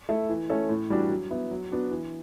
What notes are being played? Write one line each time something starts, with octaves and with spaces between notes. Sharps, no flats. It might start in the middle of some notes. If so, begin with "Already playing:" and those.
A3 E4 A4
E3
A3 C#4 E4 A4
A2
E3 G3 D4 F#4
F#3
B3 E4
F#3
B3 D4 F#4
E3